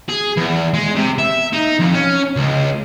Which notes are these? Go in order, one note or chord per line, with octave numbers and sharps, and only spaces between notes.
G#4
E2
G#3
C3
E5
D#4
F2
C#4
C#2